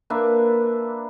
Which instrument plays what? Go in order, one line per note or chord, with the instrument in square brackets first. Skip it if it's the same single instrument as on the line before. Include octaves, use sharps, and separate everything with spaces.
[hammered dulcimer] A#3 D4 B4 E5